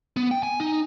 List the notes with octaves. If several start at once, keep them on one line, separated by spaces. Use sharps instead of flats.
B3
G5
G#5
D#4